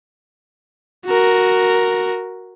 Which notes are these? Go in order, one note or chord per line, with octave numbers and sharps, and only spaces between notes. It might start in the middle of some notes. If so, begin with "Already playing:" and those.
F#4 A#4